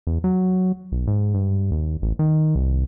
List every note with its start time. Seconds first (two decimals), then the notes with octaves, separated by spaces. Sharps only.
0.07 E2
0.24 F#3
0.92 B1
1.07 G#2
1.34 G2
1.71 D#2
2.02 A1
2.19 D#3
2.55 C2